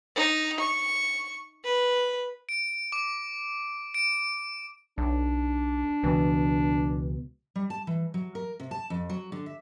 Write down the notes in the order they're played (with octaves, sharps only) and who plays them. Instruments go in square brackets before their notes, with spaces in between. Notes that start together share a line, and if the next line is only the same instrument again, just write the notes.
[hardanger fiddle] D#4
C#6
B4
[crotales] D7
D6
D7
[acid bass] B1 [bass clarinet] D4
[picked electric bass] C#2 B2 [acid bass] E3
[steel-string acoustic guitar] G3
A5
E3
F#3
A#4
C3
A5
F2
F#3
D3
E5